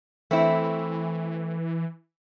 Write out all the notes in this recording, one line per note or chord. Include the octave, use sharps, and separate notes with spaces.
E3 A3 C4 E4